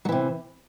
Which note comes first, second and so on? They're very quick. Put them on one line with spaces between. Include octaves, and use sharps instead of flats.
F#3 E3 C3